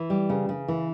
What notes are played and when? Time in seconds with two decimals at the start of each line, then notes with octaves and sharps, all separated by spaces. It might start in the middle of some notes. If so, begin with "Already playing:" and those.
Already playing: E3
0.10 G3
0.30 C#3
0.49 C#3
0.68 E3